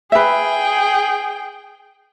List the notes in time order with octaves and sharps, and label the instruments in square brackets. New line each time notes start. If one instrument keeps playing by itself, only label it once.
[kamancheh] G#4 G5 [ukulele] B4 E5